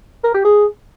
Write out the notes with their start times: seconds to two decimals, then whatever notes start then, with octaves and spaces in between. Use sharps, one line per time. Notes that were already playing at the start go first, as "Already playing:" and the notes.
0.24 A#4
0.34 G4
0.45 G#4